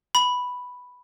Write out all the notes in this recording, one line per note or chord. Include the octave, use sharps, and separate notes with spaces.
B5